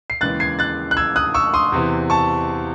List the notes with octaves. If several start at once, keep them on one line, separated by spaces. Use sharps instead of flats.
C7
D#2 C#3 E3 G#3 F#6 A6
G#6 C7
F#6 A6
F#6
E6 G#6
D#6 F#6
C#6 E6
C6 D#6
E2 C3 E3
A5 C#6